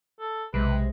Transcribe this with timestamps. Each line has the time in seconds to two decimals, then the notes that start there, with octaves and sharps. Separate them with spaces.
0.20 A4
0.54 B1 C3 G#3 B4